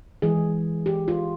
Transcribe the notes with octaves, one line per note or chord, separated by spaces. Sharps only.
E3 G#3 G#4
G4
F4